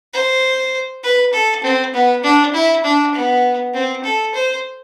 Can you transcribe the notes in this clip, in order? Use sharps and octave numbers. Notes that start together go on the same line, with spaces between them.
C5
B4
A4
C4
B3
D4
E4
D4
B3
C4
A4
C5